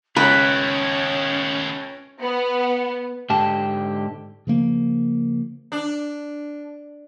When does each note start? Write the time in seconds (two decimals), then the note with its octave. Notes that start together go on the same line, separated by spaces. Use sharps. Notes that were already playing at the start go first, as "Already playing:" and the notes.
0.16 C#2 D#3 B3 C#4 B4
2.20 B3
3.30 G#2 D3 G4 A5
4.47 C#3 F3 A#3
5.72 D4